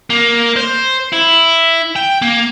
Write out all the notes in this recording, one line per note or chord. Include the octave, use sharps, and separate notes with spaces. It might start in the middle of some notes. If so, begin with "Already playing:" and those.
A#3
C5
E4
G5
A#3